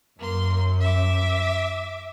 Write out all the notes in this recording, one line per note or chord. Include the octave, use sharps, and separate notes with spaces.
F#2 A#3 C6
E5 D6